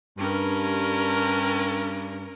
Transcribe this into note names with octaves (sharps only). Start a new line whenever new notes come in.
G2 C#4 A#4